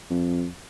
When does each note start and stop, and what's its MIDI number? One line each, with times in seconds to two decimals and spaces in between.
0.10 0.48 41